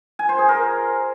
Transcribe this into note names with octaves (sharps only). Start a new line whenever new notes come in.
G#5
C5
G#4
A#4